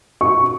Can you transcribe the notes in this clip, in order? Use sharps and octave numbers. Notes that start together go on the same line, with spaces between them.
C#6